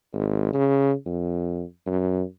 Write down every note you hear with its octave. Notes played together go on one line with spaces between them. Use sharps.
G#1
C#3
F2
F#2